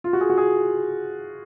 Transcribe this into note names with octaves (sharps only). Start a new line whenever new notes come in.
F4
F#4
G#4
F#4
G#4